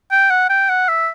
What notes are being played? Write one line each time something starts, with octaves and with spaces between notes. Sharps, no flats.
G5
F#5
G5
F#5
E5